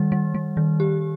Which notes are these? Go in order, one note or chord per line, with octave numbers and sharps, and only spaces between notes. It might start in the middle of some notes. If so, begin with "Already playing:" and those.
Already playing: D#3 G3
G3
G3
D#3
G4